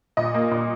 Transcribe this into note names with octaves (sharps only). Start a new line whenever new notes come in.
A#2 D#5
A#3
A#2